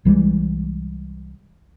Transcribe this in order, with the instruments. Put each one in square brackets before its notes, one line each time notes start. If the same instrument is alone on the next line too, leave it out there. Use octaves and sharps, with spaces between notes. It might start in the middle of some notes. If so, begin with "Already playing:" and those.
[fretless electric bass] C2 E3 G3 G#3